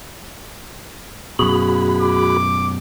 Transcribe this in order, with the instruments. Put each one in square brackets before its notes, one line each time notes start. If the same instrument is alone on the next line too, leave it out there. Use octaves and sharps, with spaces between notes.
[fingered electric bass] F#2 B2 [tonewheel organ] F#4 G#4 B5
[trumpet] D6